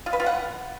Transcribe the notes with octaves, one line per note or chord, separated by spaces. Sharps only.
F4
B4
F4
F#5